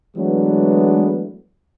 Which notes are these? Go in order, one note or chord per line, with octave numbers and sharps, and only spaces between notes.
E3 F#3 G#3 A3 B3 D4